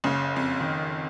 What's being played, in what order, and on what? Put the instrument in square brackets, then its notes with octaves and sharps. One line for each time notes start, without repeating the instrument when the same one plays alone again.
[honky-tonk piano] F#1 [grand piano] C#3
[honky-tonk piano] F2
[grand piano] D#3